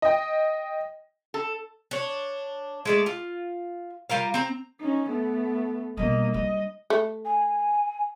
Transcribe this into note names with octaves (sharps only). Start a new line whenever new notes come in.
D#5 G5
A4
D4 C#5
G#3 A3 D5
F4
G3 F4 A#4 F5
C4 A#5
C#4 D#4
A3 B3
B2 G3 A#3 D#5
G3 D#5
A3
G#5